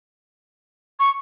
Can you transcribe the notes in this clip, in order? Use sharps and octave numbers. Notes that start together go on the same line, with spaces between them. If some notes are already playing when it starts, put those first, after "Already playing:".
C#6